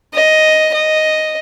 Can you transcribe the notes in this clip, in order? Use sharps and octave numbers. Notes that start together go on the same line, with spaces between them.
D#5
D#5